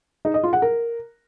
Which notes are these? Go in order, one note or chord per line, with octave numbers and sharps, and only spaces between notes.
D#4
D#5
F4
F#5
A#4